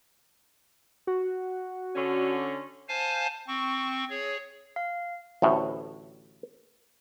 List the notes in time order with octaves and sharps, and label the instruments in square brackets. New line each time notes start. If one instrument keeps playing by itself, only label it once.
[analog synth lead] F#4
[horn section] D3 C#4
[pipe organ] C5 F5 G#5 A5
C4 C#6
G#4 C#5
[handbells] F5
[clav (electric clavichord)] A1 D2 A2